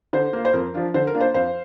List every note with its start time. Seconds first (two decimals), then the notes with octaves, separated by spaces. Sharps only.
0.13 D3 C5
0.33 A#3 F4
0.45 C5
0.53 F2 A#4
0.74 F3 D4 F4
0.94 D3 C5
1.07 A#4
1.14 A#3 D4 F4
1.20 C5
1.34 F2 C5 F5